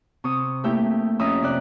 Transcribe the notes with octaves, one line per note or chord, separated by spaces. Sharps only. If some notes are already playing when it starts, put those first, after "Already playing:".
C3 C#6 D#6
A3 A#3 E4 G4 E5 G5
F2 C#4 E5 G#5 A#5 D#6
C3 D5 F#6